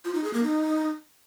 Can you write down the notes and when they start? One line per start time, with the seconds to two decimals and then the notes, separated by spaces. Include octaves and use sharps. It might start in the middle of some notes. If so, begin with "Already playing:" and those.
0.05 F4
0.14 D#4
0.24 G#4
0.34 A#3
0.43 D#4